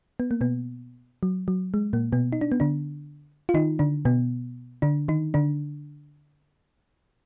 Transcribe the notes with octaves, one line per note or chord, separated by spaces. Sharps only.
B3
A#3
B2 B3
F#3
F#3
G#3
A#2 A#3
B2 B3
D#4
D4
B3
D3 D4
F4
D#3 D#4
D3 D4
B2 B3
D3 D4
D#3 D#4
D3 D4